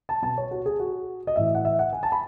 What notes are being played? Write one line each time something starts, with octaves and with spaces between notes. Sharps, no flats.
A5
B2 A5
C#5
F#4
G#4
F#4
D#5
A2 E3 E5
F#5
E5
F#5
G#5
A5
B5